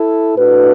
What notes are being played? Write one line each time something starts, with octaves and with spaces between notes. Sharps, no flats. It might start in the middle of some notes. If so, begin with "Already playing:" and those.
Already playing: E4 A4
A2 A3 D4 F#4 B4